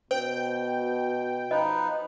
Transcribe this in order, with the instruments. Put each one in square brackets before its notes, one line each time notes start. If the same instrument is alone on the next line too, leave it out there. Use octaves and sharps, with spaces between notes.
[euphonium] B2 [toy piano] C5 [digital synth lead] G5
[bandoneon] F3 D#4 B4 [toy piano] D#5